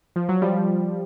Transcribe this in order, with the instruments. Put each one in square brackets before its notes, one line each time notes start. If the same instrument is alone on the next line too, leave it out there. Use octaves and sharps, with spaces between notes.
[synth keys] F3
F#3
F3 G3